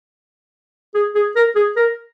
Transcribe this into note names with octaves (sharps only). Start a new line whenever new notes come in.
G#4
G#4
A#4
G#4
A#4